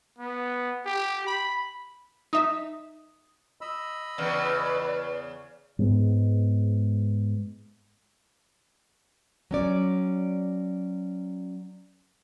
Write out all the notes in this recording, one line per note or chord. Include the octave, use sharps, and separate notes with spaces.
B3
G4
B5
D#4 E5 D#6
D#5 B5 E6
E2 C#3 B4 D5
G#2 G#3 B3
F#3 C#4 D5